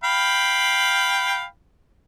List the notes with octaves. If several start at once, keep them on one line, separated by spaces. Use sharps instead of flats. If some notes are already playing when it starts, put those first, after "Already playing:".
F5 G5 B5